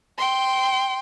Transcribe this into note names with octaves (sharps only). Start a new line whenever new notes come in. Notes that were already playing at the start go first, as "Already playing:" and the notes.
G5 C6